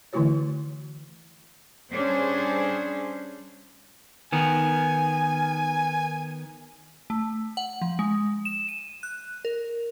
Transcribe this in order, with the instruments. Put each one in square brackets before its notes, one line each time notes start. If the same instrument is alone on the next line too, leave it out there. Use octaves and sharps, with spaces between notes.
[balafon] D3 E3 A3 E4 F#4 C#5
[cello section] G3 C#4 D4 G#4 C5
[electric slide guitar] D#3 B3 [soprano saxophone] G#5
[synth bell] A3
F#5
F3
G#3
E7
D#7
F#6
A#4